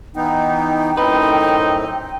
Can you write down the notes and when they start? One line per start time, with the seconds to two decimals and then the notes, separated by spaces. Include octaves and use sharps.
0.16 E3 B3 D#4 G5
0.97 F#2 A2 C4 D#4 B4